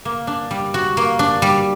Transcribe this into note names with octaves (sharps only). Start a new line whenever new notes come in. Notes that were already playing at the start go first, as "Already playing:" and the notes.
A#3
D4
G3
F#4
A#3
D4
G3